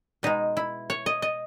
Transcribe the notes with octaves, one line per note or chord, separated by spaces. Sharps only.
B2 G#3 D#4
E4
C#5
D#5
D#5